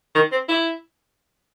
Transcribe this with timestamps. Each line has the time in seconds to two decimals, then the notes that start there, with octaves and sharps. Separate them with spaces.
0.15 D#3
0.32 C4
0.49 E4